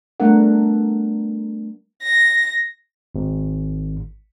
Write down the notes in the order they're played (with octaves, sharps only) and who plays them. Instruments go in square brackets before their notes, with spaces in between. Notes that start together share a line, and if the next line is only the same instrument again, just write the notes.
[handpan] G3 A3 B3 D4 A#4 F#5
[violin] A#6
[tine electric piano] G#1